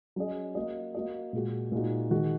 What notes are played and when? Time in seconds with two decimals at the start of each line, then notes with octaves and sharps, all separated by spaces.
0.16 F#3 C#4 G#4 D#5
0.55 A#3 F#4 D#5
0.95 A#3 F#4 D#5
1.33 A#2 G#3 F#4
1.72 A#2 G#3 D#4 F#4
2.11 D#3 G#3 F#4